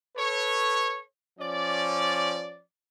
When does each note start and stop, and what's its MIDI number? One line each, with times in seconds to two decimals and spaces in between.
0.16 1.00 69
0.16 1.00 71
0.16 1.00 73
1.38 2.60 53
1.38 2.60 61
1.38 2.60 74